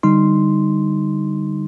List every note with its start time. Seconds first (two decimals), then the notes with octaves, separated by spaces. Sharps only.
0.03 D3 G3 D#4 C6